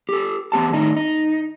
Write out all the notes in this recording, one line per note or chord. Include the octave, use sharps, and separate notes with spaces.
G4 A4
E2 B3 G4 A5
A2 D#3 D#4
D#4